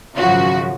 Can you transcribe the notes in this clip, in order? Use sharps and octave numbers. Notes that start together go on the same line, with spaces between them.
G#1 F#2 C#3 F3 F#4